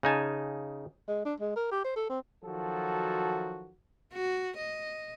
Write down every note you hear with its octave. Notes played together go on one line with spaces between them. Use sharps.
C#3 D#4 G#5 A5
G#3
D4
G#3
A#4
G4
C5
A4
C4
D#3 F3 F#3 F#4 A4
F#4
D#5